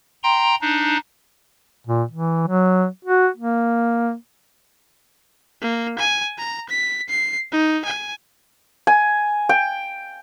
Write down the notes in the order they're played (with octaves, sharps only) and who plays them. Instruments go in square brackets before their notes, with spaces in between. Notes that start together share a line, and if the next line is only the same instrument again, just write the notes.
[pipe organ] G5 A#5 C6
D4 D#4
[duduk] A#2
E3
F#3
F#4
A#3
[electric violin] A#3
G#5
A#5
B6
C7
D#4
G#5
[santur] G#5
G5